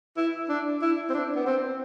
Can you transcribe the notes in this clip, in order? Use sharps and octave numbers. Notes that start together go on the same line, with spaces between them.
E4
D4
E4
C4
D4
B3
C4